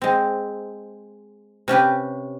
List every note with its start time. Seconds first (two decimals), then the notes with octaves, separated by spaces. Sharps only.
0.02 G#3 C4
1.68 C3 C#4 G4 B4